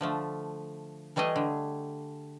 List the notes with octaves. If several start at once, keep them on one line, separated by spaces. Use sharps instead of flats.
D3 F3 A3
E3 G3 A3 G#4 D#5
D3